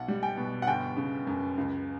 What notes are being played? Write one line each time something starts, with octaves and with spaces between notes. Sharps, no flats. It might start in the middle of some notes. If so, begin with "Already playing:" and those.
Already playing: B1 F#5
G3
G5
B2
F#5
G1 G5
C#3
F#2
C#2